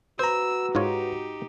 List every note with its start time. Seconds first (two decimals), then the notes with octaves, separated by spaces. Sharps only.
0.19 F#4 B4 C5 A#5 E6
0.75 G#2 D#4 F4 G4 C#5